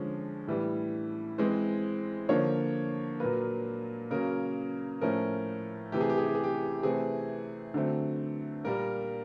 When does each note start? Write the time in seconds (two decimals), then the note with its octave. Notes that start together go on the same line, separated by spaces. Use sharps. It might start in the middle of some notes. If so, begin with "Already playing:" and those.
Already playing: D3 F3 G#3 C#4
0.47 A2 E3 G3
1.38 E3 G#3 C4 C5
2.29 D3 F3 A#3 C#5
3.20 A#2 F#3 A#3 B4
4.11 C#3 F#3 A#3 C#4 A#4
5.01 A2 F3 A3 C#4 A#4
5.92 C3 E3 A3 G4
6.01 G#4
6.10 G4
6.18 G#4
6.26 G4
6.35 G#4
6.44 G4
6.83 C3 E3 A3 C4 G#4
7.74 D3 F#3 A3 C4
8.64 A#2 G3 A#3 A#4